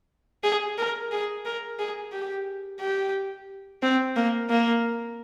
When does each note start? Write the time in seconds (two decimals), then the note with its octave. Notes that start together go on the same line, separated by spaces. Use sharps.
0.43 G#4
0.78 A#4
1.12 G#4
1.45 A#4
1.79 G#4
2.12 G4
2.81 G4
3.82 C4
4.16 A#3
4.50 A#3